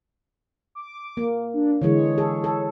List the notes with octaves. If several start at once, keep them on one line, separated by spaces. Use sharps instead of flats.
D6
A#3
D4
D3 E3 G#3 C#5
G#4 A4
A4